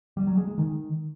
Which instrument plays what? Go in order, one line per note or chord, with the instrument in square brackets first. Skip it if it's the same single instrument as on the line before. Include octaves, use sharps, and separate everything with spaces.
[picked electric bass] G3
F#3
G#3
G#3
D#3